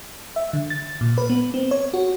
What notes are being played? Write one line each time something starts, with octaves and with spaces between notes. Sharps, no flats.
E5
D3
A6
A#2
B4
B3
C4
C#5
F#4